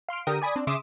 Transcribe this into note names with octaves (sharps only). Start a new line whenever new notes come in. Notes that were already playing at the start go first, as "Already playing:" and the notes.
F5 C6 F6 D7
D3 G4 A#4 G5 D#6 D#7
D5 G#5 B5 D#6
C4 D4
C#3 E5 C6 D6 D#6 E7